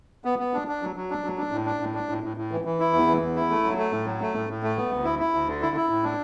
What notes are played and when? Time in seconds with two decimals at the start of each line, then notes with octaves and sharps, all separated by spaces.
0.25 B3
0.39 B3
0.54 D4
0.68 D4
0.82 F#3
0.96 F#3
1.10 D4
1.24 F#3
1.38 D4
1.52 A2
1.66 D4
1.80 A2
1.95 D4
2.09 A2
2.23 A2
2.37 A2
2.51 E3
2.65 E3
2.80 E4
2.93 E2
3.07 E3
3.21 E2
3.36 E4
3.50 A3
3.64 F#3
3.77 A3
3.92 A2
4.06 F#3
4.21 A3
4.35 A2
4.49 A2
4.63 A3
4.77 B3
4.92 D2
5.04 E4
5.19 E4
5.34 D2
5.48 D3
5.61 E4
5.76 E4
5.89 A2
6.04 D4